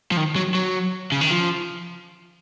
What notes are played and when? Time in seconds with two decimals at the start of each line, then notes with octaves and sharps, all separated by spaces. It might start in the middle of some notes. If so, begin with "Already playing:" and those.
0.12 F3
0.17 D#3
0.36 F#3
0.55 F#3
1.12 C#3
1.21 D#3
1.31 F3